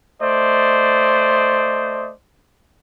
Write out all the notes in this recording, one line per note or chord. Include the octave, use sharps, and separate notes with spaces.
A3 C5 D5 D#5